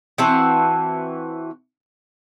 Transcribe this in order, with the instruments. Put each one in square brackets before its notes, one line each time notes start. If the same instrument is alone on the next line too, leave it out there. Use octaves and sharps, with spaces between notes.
[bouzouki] E3 C4 F#4 A5